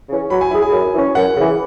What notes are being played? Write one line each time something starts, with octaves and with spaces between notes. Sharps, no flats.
C#3 E3 C#4
F#3 B5
G#5
E4 G#4 B5
G#5
F#2
E3 C#4
F#2 F#5
C#3 E3